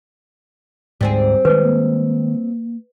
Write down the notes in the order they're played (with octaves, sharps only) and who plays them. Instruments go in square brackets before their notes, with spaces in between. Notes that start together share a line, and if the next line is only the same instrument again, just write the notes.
[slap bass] D2 G#2 [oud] G3 C4 G#4
[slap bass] D#3 G#3 [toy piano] B4
[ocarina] A#3